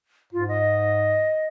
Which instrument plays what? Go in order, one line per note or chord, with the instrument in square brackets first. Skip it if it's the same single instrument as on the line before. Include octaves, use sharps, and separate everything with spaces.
[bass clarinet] G#2 [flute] F4
[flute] D#5